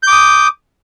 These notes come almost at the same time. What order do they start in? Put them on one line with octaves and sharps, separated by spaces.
G6 D6 D#6